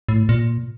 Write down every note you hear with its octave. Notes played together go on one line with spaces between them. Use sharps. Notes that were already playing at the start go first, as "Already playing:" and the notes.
A2
A#2